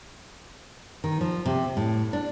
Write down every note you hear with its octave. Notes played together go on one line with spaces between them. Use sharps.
D#3
F3
C3
A2
D4